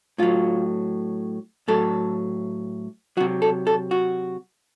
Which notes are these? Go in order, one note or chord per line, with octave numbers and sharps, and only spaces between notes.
A2 F#3 F4
A2 F#3 A4
C3 F#3 F#4
A4
A4
F#4